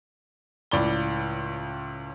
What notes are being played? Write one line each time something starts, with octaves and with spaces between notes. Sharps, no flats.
C#2 A2 D5 B5 G7